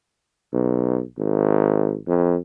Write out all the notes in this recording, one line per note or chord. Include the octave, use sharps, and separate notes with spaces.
B1
G#1
F2